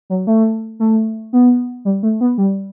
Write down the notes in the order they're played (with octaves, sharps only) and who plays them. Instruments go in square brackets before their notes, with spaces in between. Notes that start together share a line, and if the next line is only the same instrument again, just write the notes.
[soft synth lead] F#3
A3
A3
B3
G3
A3
B3
G3